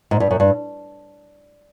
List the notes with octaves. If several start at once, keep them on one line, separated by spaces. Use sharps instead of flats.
G#2
G2
F#2
G2